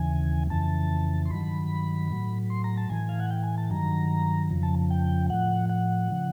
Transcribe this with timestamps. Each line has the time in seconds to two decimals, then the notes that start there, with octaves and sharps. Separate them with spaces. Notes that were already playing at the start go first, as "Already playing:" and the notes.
Already playing: D#2 C#3 E3 G#5
0.50 F2 C#3 E3 A5
1.25 C6
1.30 G2 D#3 F#3 B5
2.10 A2 F#3
2.50 C6
2.64 A#5
2.77 A5
2.90 A2 E3 G#5
3.09 F5
3.20 F#5
3.31 G5
3.44 G#5
3.57 A5
3.70 G2 D#3 F#3 A#5
4.50 F2 C#3 F3
4.63 A5
4.90 G5
5.30 A2 F3 F#5
5.69 F#5
6.11 C#3 F3